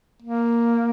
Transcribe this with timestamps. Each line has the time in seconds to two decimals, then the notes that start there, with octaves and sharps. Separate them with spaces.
0.23 A#3